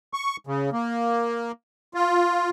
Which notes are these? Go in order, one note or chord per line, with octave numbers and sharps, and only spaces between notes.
C#6
C#3
A#3
F4